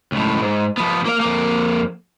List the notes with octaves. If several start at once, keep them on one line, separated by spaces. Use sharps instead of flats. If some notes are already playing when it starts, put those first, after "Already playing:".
C#2 A2
G#2
F3 B3
A#3 F5
F2 A#3